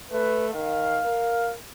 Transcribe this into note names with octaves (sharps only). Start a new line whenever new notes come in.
A3 B4
D#3 F5
A#4